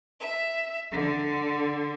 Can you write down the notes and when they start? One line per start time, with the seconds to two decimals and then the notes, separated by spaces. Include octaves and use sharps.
0.19 E5
0.90 D3